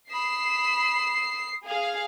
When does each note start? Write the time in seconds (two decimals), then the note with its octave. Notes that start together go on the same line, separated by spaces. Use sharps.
0.11 B5 D#6 C7 E7
1.65 G#4 F5